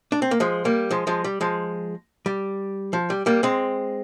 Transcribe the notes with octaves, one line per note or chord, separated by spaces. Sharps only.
D4
C4
A#3
F3 G#3
G3 A#3
F3 G#3
F3 G#3
G3
F3 G#3
G3
F3
G3
G3 A#3
G#3 C4